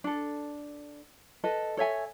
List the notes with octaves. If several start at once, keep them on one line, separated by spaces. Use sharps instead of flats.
D4 A4
A4 B4 D#5
A4 C#5 E5 G#5